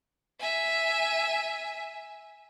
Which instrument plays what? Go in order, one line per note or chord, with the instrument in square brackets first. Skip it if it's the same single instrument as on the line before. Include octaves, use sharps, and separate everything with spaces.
[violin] E5 G#5